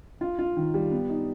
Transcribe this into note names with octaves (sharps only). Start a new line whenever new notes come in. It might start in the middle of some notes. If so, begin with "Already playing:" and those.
F4
F4
D#3
G3
B3
D#4